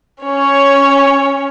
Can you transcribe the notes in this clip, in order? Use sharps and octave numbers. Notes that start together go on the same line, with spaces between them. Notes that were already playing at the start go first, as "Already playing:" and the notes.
C#4 C#5